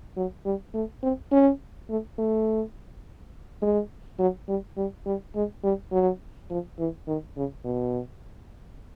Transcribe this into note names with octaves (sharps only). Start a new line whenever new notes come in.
F#3
G3
A3
C4
C#4
A3
A3
G#3
F#3
G3
G3
G3
G#3
G3
F#3
F3
E3
D#3
C#3
B2